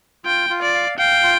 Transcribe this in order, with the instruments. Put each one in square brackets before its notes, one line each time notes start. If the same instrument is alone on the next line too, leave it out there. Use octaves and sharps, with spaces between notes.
[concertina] F4 [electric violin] G5
[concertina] F4
[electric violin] D5
[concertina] F5
[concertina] F5 [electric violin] G5
[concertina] F4